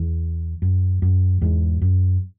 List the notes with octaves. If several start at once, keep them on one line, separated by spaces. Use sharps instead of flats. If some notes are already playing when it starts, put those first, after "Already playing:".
Already playing: E2
F#2
F#2
E2 G#2
F#2